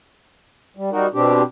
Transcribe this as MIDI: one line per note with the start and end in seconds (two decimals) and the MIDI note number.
0.77 0.90 55
0.92 1.06 55
0.92 1.06 63
0.92 1.06 66
0.92 1.06 70
1.14 1.42 47
1.14 1.42 60
1.14 1.42 62
1.14 1.42 67